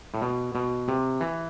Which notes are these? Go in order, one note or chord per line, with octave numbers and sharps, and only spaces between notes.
A2
B2
B2
C3
E3